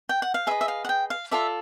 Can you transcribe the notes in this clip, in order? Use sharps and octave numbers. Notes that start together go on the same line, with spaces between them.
G5
F#5
F5
G#4 B4 D#5 E5
E5
F5
F#5
G5
F5
F4 A4 D5 E5